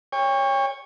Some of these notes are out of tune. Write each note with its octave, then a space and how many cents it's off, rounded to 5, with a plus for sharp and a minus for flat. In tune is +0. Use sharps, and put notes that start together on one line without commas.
C#5 +0 G5 +40